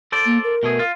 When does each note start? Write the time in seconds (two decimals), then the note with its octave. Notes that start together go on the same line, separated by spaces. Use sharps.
0.12 A4 C5 D5
0.26 A#3
0.44 A#4
0.63 B2 A3 G#4
0.79 F4